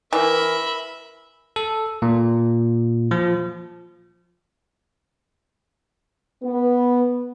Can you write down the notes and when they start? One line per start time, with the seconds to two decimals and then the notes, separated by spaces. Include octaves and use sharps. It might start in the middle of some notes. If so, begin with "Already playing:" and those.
0.13 E3 A#4 E5 B5
1.56 A4
2.02 A#2
3.11 F3
6.43 B3